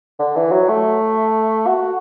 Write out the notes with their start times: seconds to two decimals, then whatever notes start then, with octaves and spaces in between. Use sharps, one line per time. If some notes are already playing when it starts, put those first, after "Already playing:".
0.19 D3
0.36 E3
0.52 F#3
0.69 A3
1.67 F#4